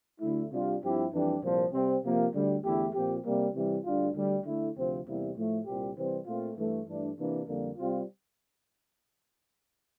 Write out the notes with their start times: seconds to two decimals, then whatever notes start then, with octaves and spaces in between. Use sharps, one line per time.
0.21 D2 D3 A3 E4
0.51 C3 G3 D4 F4
0.82 G2 F3 C4 E4 G4
1.12 F2 E3 G3 D4 G4
1.42 C2 A#2 F3
1.73 C3 G3 C4
2.02 C3 F3 A#3
2.33 D2 D3 G3
2.64 E2 D3 A3 E4 G4
2.93 A#2 F3 C4 G4
3.24 C3 G3 A#3
3.54 C3 E3 G3
3.84 D2 D3 G3 D4 F4
4.14 D2 D3 G3
4.44 D3 A3 E4
4.75 D2 C3 F3 C4
5.05 E2 C3 G3 A#3 E4
5.35 A2 F3 A3
5.66 C2 A#2 G3 C4 G4
5.96 C3 E3 G3 C4
6.26 A#2 A3 C4 F4
6.56 G2 E3 A3
6.87 G2 E3 A3 D4
7.17 C3 E3 A#3 D4
7.47 F2 D3 G3 A#3
7.77 C3 G3 C4 F4